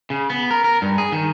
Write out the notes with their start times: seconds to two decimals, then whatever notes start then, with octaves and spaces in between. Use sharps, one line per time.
0.10 C#3
0.30 B3
0.51 A#4
0.64 A#4
0.82 G2
0.98 G#4
1.12 D#3